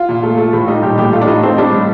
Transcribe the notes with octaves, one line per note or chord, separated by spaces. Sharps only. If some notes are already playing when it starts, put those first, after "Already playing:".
Already playing: F4
A#2
A3
A3
A2
G3 D#4
A#2 G4
A2 G4
A3 F4
D4
A2 D#4
A3 C4
G3 D4
A2